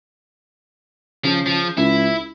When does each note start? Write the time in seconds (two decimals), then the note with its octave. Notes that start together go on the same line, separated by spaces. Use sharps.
1.24 C#3 F3
1.46 F3
1.78 C#2 E4